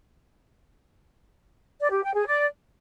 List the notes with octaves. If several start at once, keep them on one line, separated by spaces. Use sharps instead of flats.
D5
G4
G5
G#4
D5